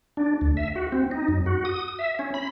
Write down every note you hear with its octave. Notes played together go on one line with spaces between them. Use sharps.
D4
D2
E5
F#4
C4
D#4
F#2
F#4
D#6
E5
C#4
B5